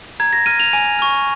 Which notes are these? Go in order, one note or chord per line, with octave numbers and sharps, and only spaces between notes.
A#5 G#6
A#6
F6 D#7
F7
G#5 D#7
C#6 F6